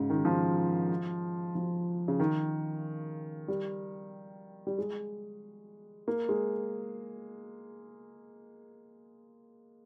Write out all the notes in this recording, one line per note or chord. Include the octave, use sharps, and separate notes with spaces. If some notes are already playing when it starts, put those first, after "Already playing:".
Already playing: G#2 C#3
D#3
F3
F3
C#3
D#3
G3
G3
G#3
A#3
G#3